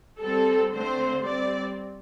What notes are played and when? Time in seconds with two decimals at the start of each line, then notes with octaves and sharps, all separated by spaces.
0.22 G3 C4 A4
0.73 D3 A3 C4 C5
1.24 G3 C4 D5